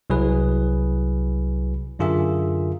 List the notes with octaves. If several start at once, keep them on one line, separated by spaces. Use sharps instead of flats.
C2 F#3 E4 G#4 B4
F#2 D3 F4 G#4 A#4 E5